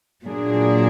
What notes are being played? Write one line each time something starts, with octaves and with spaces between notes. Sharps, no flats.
A#2 F#3 A#3 D4 G#4